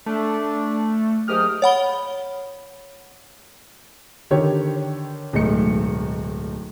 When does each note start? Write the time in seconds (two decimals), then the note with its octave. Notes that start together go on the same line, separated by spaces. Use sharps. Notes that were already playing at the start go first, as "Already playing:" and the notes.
0.06 A3 D4
1.28 G#2 F#3 A#3 G4 D#6 F6
1.62 C#5 F#5 B5 G7
4.31 D3 D#3 G4 C#5
5.33 D1 B1 G#3 A3 C#7